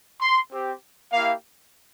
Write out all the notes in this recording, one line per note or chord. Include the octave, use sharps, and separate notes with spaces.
C6
C4 G4
A#3 E4 G4 F5